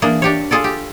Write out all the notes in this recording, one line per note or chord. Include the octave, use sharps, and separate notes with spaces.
E3 A#3 D4 G#4
D4 G4 C#5
F4 G#4 A4 D5
G4